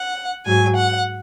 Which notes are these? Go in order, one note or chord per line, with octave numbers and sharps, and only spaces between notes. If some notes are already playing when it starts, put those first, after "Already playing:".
Already playing: F#5
G#2 F#3 G#5
F#5